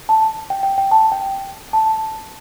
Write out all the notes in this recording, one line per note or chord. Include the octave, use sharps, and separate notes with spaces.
A5
G5
G5
G5
A5
G5
A5